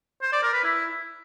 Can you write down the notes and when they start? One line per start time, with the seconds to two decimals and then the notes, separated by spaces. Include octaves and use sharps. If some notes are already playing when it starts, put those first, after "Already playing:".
0.22 C5
0.32 D5
0.43 A#4
0.53 B4
0.64 E4